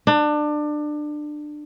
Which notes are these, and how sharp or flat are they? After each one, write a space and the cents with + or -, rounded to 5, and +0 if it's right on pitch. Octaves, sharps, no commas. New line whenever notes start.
D4 +25